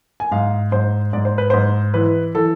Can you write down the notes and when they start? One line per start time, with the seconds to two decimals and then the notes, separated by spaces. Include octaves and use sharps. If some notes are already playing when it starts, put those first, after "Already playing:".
0.20 G#5
0.31 G#2 F5
0.72 G#2 C5
1.13 G#2 D5
1.25 C5
1.38 B4
1.50 G#2 C5
1.94 E3 B4
2.35 E3 A4